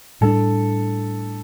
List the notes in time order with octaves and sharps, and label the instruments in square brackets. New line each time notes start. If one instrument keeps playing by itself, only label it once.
[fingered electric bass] A2 G3 B3 D4 [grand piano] A4